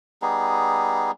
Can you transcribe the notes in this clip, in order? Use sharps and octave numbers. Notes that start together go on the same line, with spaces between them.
G3 B3 D#4 G#4